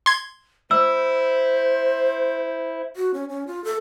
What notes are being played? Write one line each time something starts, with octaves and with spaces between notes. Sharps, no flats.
C6 G#6
E4 C5 E6
F#4
C#4
C#4
F4
A4